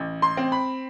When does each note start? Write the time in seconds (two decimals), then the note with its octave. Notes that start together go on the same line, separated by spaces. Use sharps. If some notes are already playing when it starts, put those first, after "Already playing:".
Already playing: A1
0.22 C6
0.37 C4
0.52 B5